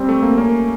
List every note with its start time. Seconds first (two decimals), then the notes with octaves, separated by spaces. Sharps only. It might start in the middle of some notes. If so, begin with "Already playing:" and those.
Already playing: G3 C4
0.09 A3
0.22 A#3
0.37 A#3 C#4